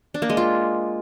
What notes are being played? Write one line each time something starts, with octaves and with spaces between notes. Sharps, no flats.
D4
A#3
G#3
F4